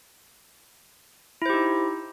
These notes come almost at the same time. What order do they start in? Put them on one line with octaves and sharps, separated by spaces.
E4 C5 G4 D#4